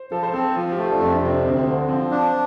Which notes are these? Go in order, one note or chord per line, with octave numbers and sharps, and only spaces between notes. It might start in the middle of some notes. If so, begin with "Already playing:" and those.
Already playing: C5
F3 A4
C5
C4 A4
F3 F4
G4
A3 F4
D4
F2 C4
D4
C3
D4
D2 C4
C4
D3
F3 C4
D4